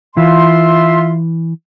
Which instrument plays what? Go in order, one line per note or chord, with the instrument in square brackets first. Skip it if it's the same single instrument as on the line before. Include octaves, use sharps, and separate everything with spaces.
[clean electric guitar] E3 [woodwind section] F4 E5 C6